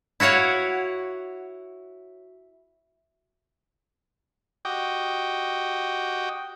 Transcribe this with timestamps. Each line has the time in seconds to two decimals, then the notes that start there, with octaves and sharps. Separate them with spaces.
0.20 E4 F#4 C#5 F5 F#5
4.65 F#4 G4 D#5 G5